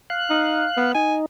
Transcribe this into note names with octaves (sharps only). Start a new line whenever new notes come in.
F5 F#6
D#4
B3
D#4 G#5